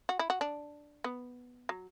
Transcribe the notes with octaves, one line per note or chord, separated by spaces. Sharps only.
F#4
E4
F#4
D4
B3
F#3